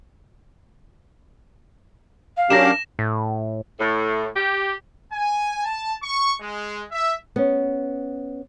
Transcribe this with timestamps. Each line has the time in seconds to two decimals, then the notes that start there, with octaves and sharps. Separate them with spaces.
2.37 F5
2.50 F#3 C#4 D4 G4 A#4 A#6 E7
2.99 A2
3.79 A2
4.36 G4
5.12 G#5
5.64 A5
6.03 C#6
6.40 G#3
6.92 E5
7.36 B3 C#4